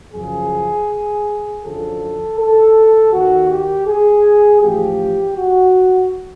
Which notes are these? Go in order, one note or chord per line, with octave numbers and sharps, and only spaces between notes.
F#2 C#3 F3 G#4
F#2 D3 F3 A4
A4
D#2 D#3 F#4
G4
G#4
A1 G#2 F3 G4
F#4